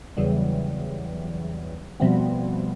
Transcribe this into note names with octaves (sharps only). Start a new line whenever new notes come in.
E2 C#3 E3 F#3 G3
B2 F3 G3 A3 B3 C4